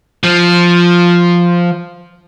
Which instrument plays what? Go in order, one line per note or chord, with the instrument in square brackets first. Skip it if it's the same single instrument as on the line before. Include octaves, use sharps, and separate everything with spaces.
[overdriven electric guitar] F3